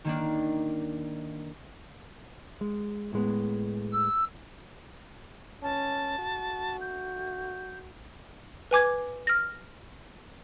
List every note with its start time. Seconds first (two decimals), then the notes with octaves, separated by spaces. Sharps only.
0.04 D#3 A#3 D4
2.61 G#3
3.13 A2 G#3 B3
3.93 E6
5.63 C#4 A5
6.19 F#4
6.81 G6
8.71 B4 G#5 D6 G#6
9.27 F6 A#6